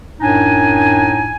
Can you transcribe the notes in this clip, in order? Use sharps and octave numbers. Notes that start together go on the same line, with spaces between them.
F#2 A2 D4 D#4 G#5